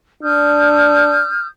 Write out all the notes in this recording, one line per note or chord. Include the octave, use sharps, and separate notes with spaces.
D4 D#6 F6 G6